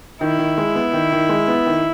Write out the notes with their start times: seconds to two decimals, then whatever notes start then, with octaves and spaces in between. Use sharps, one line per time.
0.21 D#3 E4
0.39 D#3
0.58 G#3
0.76 B3
0.93 D#3
1.12 D#3
1.29 G#3
1.48 B3
1.66 D#3